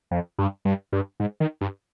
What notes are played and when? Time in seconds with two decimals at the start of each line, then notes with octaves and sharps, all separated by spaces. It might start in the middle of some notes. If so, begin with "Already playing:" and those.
0.11 F2
0.38 G2
0.65 G2
0.92 G2
1.20 G#2
1.40 D#3
1.61 G2